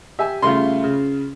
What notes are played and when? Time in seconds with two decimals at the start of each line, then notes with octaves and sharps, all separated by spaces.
0.19 G4 E5 G#5
0.42 C#3 G3 A3 F4 C6
0.84 C#3